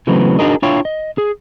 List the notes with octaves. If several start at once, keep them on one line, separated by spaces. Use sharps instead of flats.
C#3 E3 F#3 A3 B3 C4
D4 D#4 F#4 G#4 A#4 D#5
D4 E4 F4 C#5 F5 G5
D#5
G#4